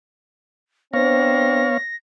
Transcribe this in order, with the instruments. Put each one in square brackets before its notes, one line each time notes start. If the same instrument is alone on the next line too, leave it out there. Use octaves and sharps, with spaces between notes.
[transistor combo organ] B3 C#5 F5 [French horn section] C4 D4 C5 [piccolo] A#6